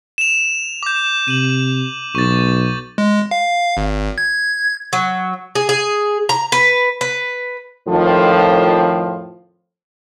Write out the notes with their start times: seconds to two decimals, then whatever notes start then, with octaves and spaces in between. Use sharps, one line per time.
0.18 E7 F7
0.83 D6 G6
1.28 C3 D#7 F#7
2.15 B1 C#6 A6
2.98 G#3
3.31 F5
3.77 G#1
4.18 G#6
4.93 F#3
5.55 G#4
5.69 G#4
6.29 A#5
6.52 B4
7.01 B4
7.88 F2 A2 D#3 F3